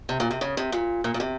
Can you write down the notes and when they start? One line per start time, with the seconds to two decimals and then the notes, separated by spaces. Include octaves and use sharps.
0.09 C3
0.20 A#2
0.31 C3
0.41 C#3
0.57 C3
0.72 A#2
1.04 A#2
1.14 A#2
1.20 C3